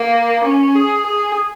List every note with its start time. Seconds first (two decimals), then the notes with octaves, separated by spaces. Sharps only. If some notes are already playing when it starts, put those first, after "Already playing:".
Already playing: A#3
0.44 C#4
0.75 G#4
1.06 G#4